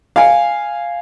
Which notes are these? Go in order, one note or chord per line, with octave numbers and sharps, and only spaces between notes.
F5 G#5